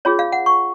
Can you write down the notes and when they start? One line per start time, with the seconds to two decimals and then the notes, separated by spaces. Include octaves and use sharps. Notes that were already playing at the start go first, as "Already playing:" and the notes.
0.05 C#4 F4 G#4 C#5
0.19 F5
0.32 F#5
0.46 C#6